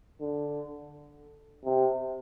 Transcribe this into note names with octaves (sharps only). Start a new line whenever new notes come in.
D3
C3